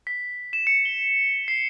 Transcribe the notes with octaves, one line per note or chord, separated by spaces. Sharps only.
B6
E7
C#7
G7
C7